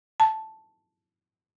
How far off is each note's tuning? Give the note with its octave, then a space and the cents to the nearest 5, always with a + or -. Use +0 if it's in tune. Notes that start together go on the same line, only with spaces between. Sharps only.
A5 -5